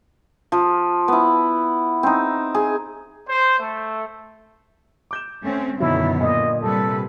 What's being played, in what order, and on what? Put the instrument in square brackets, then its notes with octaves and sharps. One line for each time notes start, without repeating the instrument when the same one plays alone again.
[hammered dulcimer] F3
B3 E4
C4 D#4
G#4
[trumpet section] C5
A3
[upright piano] D6 G6 E7
[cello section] A3 C4 C#4
[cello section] F#2 D3 B3 [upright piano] B2 D#3 F#3 [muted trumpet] E4
[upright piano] A#2 [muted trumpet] D#5
[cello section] C3 G3 B4 [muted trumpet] A4